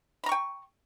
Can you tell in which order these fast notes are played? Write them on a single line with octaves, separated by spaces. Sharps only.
B5 A#5 C#6 G5